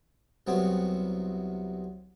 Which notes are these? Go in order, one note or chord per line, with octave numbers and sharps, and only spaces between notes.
C2 C3 F#3 B3